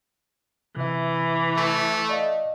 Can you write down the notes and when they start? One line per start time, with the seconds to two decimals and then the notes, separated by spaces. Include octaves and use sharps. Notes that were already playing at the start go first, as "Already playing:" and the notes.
0.76 C3 E3 E5
1.57 A3
2.09 D5 D#5 F5